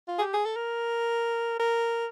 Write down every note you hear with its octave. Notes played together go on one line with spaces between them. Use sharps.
F4
G#4
G4
G#4
A4
A#4
A#4